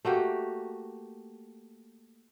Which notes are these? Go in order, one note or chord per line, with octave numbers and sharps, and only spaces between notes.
A3 A#3 F#4 G4